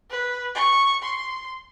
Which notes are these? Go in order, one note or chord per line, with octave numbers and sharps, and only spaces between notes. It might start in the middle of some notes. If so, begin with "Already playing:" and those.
B4
C#6
C6